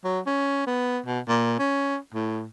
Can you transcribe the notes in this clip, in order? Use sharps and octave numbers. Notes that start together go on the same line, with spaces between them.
F#3
C#4
B3
B2
A#2
C#4
A2